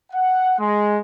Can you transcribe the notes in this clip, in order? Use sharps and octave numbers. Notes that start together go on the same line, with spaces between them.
F#5
G#3